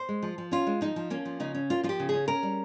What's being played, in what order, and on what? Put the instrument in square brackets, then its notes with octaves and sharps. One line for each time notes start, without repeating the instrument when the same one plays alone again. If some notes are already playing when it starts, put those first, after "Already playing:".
Already playing: [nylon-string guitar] C5
G#3
F3
F3
C#4 F4
G#3
F3 D#4
F3
A#3 C#4
F3
C#3 D#4
C#4
A#3 F4
F3 F4
G4
C#3
C#4 G#4
C#4 A#4
G3